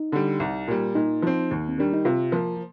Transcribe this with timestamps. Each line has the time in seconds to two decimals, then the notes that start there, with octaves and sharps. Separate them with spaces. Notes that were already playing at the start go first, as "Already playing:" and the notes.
Already playing: D#4
0.12 D3 G3
0.40 C2
0.68 A#2 G3
0.95 A#2 D#4
1.22 F3 C4
1.51 D#2
1.69 C4
1.78 D#3 G3 D4
1.94 D#4
2.05 C3 F4
2.32 F3 A#3